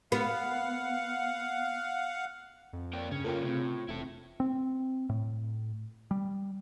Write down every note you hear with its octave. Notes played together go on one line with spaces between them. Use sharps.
B3 F5 F#5
F2
A#3 A#4 D5 G5
G2 C#3 C#4
A2 A#3 C#4 F4 A4 A#4 G5
A2 C3 C4
E1 E4 A4
C4
A2
G3